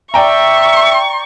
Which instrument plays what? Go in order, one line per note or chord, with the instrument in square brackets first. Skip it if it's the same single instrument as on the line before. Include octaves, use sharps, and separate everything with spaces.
[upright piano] D5 G5 A#5 [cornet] E5 [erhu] C#6